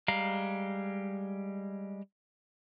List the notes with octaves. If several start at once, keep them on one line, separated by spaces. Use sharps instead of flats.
G3 G#3 F5 A#5